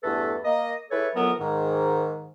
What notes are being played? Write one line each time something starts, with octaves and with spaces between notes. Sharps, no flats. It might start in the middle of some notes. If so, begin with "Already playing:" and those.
E2 G2 A3 A4 B4
A#3 D#5
E3 E4 G#4 A4 B4 C#5
F2 D#3 E3 F#3 B3 A#4
G#2 D#3